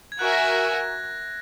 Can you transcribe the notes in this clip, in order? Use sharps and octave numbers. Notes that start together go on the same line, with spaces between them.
G#6
F#4 A#4 E5 G#5 F#6
A#6
F#6